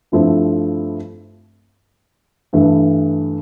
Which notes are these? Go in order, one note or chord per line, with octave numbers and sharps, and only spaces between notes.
G2 F3 A3 C4 E4
G2 E3 A3